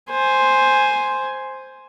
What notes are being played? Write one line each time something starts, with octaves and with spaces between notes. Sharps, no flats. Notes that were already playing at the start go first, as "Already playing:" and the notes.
C5 G#5